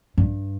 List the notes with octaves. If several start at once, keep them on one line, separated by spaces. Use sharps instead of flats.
G2